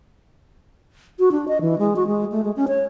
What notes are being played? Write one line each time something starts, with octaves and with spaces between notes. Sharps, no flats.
F#4
D4
D#5
E3
G#3
F#4
G#3
A3
G#3
C#4
C#5